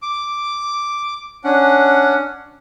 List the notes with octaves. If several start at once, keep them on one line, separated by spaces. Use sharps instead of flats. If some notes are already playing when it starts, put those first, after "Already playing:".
D6
C#4 D4 F#5